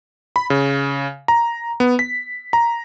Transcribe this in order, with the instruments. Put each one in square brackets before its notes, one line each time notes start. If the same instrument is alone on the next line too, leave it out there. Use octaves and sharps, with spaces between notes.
[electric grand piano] B5
C#3
A#5
B3
B6
A#5